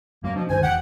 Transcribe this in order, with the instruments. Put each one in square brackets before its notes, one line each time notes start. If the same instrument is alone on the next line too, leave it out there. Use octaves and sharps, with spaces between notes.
[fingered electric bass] G2 F#3 [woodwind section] A#3
[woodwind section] B2 F3 [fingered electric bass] D4
[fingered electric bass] D2 G2 D#3 [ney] C5 [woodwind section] G#5
[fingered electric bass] E1 [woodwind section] F#5 [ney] G5